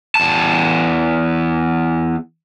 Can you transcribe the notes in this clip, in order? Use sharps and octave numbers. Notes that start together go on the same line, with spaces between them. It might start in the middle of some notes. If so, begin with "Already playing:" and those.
E2 A5